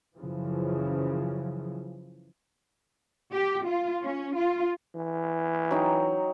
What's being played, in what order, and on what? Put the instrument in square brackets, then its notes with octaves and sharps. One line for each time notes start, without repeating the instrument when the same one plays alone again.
[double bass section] F#2 C#3 E3 F3
[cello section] G4
F4
C#4
F4
[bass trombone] E3
[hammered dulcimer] F#3 D#4 G5